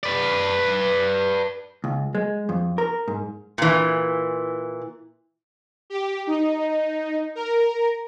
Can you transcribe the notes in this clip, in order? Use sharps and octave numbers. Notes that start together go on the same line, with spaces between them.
B4 D5
C#2
G#3
F2
A#4
G#2
A#2 E3
G4
D#4
A#4